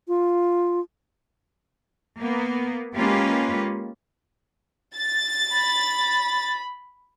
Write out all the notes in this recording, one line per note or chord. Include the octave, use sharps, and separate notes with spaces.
F4
A#3 B3
G#3 A#3 C#4 F4 G4 B4
A6
B5